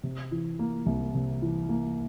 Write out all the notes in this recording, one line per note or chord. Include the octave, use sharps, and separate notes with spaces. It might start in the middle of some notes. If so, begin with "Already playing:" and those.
C3
E3
A#3
C2
C3
E3
A#3